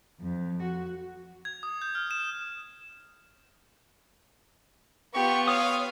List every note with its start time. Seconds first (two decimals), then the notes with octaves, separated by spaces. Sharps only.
0.20 F2
0.62 F#4
1.45 G#6
1.63 D#6
1.82 G6
1.95 F6
2.11 E7
5.15 B3 F4 G4 C#6
5.48 C#5 F5 D#6